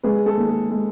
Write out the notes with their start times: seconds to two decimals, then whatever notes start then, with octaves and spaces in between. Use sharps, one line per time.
0.03 G#3 G#4 B4
0.16 G#4
0.26 A4
0.37 D#2
0.49 G#4
0.70 G#3 A4